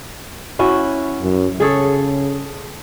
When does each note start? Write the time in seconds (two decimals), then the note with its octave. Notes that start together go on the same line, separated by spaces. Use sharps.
0.59 C#4 E4 F#4
1.22 F#2
1.60 C#3 G#4 A4 C#5